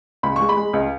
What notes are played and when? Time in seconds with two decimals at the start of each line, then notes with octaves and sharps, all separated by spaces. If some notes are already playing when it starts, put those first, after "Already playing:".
0.23 C#2 B5
0.36 G#3 C#6
0.49 B5
0.57 G#3
0.73 C#2